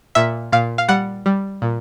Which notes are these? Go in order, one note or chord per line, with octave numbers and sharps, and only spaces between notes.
A#2 E5
A#2 F5
F5
G3 F#5
G3
A#2